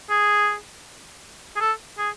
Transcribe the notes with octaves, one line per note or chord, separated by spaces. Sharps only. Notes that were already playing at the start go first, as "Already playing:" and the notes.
G#4
G#4
A4
G#4